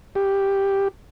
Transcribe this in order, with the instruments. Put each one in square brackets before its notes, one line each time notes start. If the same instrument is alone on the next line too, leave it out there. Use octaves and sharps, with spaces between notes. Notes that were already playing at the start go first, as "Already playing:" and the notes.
[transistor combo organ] G4